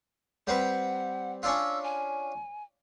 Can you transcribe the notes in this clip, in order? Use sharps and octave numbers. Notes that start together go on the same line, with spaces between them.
G3 C4 B4 F#5
C#4 D4 F4 E6
G#5